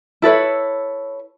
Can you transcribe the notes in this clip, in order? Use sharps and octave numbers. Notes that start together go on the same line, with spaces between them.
E4 A4 B4 C#5